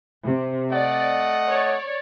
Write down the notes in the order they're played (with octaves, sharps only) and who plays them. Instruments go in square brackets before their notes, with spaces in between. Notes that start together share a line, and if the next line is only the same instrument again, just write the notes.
[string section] C3
[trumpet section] A3 D#5 F#5 [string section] D5
[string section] C#5 D5